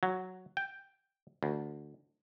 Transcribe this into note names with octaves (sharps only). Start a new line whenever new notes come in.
F#3
G5
D2